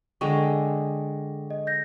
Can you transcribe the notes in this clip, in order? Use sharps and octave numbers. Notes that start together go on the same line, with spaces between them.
D3 G#3 G5 C#6
D#5
G6 A#6